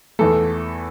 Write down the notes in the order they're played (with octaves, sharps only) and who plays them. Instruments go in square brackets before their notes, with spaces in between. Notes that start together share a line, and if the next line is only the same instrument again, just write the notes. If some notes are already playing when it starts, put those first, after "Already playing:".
[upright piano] E2 E3 A3 A4